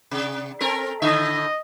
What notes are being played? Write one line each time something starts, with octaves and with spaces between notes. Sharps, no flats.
C3
C4 A4 A#4
A2 D3 D#5 E5